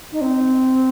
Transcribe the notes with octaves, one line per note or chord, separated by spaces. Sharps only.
D#4
C4